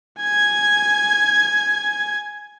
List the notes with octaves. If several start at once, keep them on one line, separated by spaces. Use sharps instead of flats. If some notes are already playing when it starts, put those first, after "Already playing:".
G#5 G#6